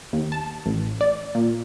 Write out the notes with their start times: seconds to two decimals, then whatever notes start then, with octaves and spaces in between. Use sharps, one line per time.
0.13 D#2
0.32 A5
0.66 A1
1.01 D5
1.35 A#2